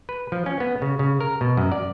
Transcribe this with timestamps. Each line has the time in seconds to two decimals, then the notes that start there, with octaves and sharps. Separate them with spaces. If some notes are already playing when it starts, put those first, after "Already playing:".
0.09 B4
0.32 F3
0.46 C#4
0.60 B3
0.82 C#3
0.99 C#3
1.20 A#4
1.41 B2
1.57 F#2
1.72 D5